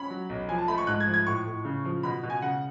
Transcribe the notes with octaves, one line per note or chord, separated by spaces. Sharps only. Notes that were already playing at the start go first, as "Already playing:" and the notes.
Already playing: C#4 B5
F#3
B1
F3 G#5
A5
A3 B5
C#6
G#2 F#6
G#6
F3
G#6
A2 C#6
A2
C#3
F3
B2 B5
B2
G#5
C#3 F#5